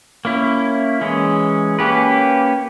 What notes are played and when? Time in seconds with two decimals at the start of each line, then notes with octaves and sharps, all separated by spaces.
0.25 A#3 C#4 E4
1.01 E3 G#3 C#4
1.79 A#3 C#4 G4 B4